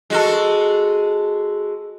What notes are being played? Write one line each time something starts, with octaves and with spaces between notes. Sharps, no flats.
G#3 F#4 A4